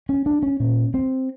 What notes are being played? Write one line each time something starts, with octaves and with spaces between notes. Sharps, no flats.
C#4
D4
C#4
A#2 C#4
C4